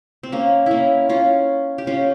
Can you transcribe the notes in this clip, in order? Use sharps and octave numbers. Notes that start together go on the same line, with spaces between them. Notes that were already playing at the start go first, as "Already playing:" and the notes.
C4
A#3 C#4
A#3 C#4 E4
C#4 F4
G4
C#4 F4